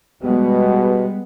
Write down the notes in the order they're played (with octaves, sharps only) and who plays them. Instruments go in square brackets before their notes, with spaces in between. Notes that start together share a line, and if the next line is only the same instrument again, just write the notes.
[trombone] B2 [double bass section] G3 G#3 B3